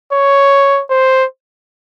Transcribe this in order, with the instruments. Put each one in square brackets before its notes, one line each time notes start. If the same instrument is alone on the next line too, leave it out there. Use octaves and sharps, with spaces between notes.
[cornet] C#5
C5